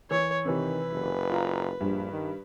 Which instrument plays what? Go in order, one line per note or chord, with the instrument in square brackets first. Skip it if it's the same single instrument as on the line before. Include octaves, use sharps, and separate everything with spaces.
[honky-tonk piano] E3 [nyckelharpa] C#5
[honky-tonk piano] C3 E3 [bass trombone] D#3 [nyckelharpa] B4
[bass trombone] F#1
[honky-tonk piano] F4 A#5
[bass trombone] A#1 [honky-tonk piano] G2
[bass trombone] D#3